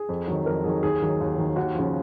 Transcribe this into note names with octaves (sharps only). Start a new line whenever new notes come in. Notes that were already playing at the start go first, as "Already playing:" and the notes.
Already playing: G#4
F2
D#3 F#3
F2 A#4
D#3 F#3 G#4
D#2 G#4
D#3 F#3
D#2
D#3 F#3
D#2 F#4
C#3 F3